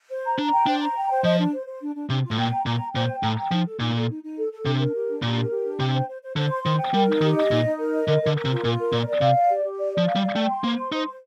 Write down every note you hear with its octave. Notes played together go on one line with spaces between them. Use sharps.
C5
A#5
D4 A#5
G5
D4 C5
A#5
G5
C5
F3 D#5
D4
C5
C5
D4
D4
C3 D4
F4
A2
A#2 G5
A#5
A#2 A#5
G5
A#2 C5
G5
A2 A#5
G5
F3 D#4
A4
A#2 D#4
A4
D#4
D#4
A4
A4
C3 D4
A#4
G4
D4
A#2 G4
A#4
G4
D4
C3 G5
C5
C5
C5
D3 C5
C6
D#3 C5
G5
G3 A#4
D#4
D#3 G4
D#5
A#2 D#4
D#4
A#4
D#5
D3 A#4
D3 A#4
A#4
C3
F4
A#2 F4
A#4
A#2 D5
D5
C3 F5
D5
G4
G4
D5
F3 D5
F5
G3
D5
A3 G5
C6
A#3 C5
C6
D#4 C5
C5